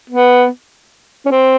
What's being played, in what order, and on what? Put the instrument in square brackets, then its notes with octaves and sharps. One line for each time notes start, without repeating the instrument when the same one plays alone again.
[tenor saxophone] B3
C#4
C4